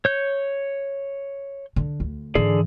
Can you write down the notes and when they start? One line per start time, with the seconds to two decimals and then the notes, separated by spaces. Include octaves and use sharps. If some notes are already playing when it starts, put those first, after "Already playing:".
0.05 C#5 G6
1.76 D3
2.00 D2
2.35 G#2 D3 E3 G#4 D5